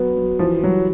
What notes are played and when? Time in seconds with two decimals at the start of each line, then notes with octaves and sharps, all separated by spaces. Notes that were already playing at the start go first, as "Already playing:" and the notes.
Already playing: F#3 B3
0.17 F#3
0.39 E3 F3
0.63 F#3 G3